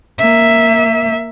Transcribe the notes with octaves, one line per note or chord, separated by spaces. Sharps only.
A#3 E5